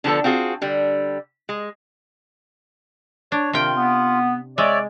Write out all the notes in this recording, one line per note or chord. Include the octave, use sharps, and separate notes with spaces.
D3 F3 B3 A4
C4 F4 F#4 G#4
D3 G3
G#3
D4 C#5
C3 D#3 F4 G5
B3
G#3 C#5 D5 E5